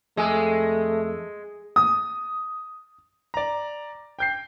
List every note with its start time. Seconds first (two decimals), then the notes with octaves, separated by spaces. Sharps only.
0.17 F2 G#3 A3 A4 G#5
1.76 D#6
3.34 D5 A#5
4.19 G5 G6 C7